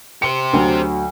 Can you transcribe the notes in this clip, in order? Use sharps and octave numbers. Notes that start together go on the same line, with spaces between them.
G4 C5 C#7
D2 F#3